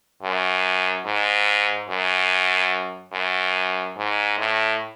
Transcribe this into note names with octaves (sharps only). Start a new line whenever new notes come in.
F#2
G#2
F#2
F#2
G#2
A2